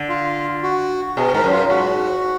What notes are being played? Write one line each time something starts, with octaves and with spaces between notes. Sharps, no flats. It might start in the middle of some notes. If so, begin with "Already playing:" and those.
Already playing: D3
F4
F#4
B2 G#4
G#2 A#4
F#2
F4
G#2 F#4